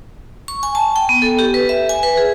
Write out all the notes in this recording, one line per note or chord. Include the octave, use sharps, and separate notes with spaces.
C#6
G#5
A5
G5
B3
A4
G4
B4
E5
G#5
B4
G#4